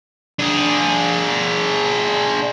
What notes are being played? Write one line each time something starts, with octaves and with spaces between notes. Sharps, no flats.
D4 G#4